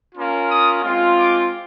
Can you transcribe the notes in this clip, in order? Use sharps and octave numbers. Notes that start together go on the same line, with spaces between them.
A#3 C#4 F4
D#6
G#3 C4 F4
D6